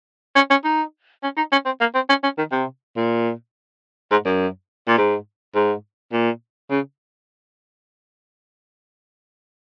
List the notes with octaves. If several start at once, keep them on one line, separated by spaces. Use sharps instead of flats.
C#4
C#4
D#4
C#4
D#4
C#4
C4
A#3
C4
C#4
C#4
D#3
C3
A#2
G#2
F#2
A#2
G#2
G#2
A#2
C#3